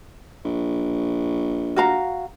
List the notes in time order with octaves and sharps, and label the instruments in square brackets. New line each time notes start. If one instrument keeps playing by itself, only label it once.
[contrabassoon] A#1
[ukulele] F#4 F5 A#5